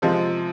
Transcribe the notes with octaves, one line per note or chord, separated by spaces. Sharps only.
C3 F3 G#3